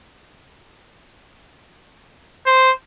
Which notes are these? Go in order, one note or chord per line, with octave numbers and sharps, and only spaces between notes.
C5